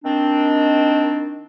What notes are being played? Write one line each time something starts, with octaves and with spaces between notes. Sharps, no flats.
D#3 C4 D4